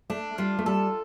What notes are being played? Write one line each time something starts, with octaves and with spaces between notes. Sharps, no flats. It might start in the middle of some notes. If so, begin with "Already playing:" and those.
A3 D4
G3 F4
A3
G3 A4